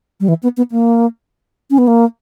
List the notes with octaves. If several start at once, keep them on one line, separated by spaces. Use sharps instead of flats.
G3
E3
B3
B3
A#3
C#4
B3
A#3